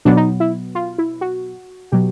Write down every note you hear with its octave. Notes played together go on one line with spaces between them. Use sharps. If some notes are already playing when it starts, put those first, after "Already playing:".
B2 F#3 B3 D4
D#4
E4
F4
E4
F#4
B2 F#3 G4